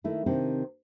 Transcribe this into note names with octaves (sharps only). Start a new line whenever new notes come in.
D#3 A3 E4
C3 D#3 C4 D4